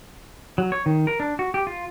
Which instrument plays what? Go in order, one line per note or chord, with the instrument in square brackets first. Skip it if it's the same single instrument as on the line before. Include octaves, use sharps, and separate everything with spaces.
[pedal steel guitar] F#3
C#5
D#3
A#4
D4
F#4
G4
F4